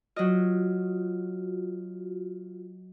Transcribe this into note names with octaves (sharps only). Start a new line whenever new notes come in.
F#3 F4 F#4 D#5